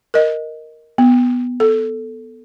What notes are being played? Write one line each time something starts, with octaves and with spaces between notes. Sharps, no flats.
A#4 D#5
B3
A4